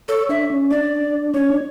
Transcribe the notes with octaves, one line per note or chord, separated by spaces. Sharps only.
A4 C#5
D4 E5
C#4
D4 D5
C#4 C#5
D4